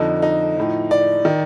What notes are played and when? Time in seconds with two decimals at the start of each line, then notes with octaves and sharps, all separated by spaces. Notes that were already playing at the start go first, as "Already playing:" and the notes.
Already playing: F2 D3 F3 D#4
0.22 D#4
0.57 A2 F3
0.91 D5
1.25 D#3